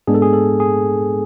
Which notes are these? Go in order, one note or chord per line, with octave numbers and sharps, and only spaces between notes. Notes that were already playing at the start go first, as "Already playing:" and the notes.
G#2 G#3 B3 D4 G#4
A4
G#4
A4
G#4